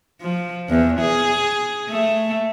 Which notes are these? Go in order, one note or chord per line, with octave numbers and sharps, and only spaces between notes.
F3
E2
G#4
A3